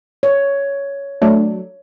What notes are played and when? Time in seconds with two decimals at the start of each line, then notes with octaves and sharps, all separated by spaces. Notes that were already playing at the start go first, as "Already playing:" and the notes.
0.23 C#5
1.22 F#3 A3 D4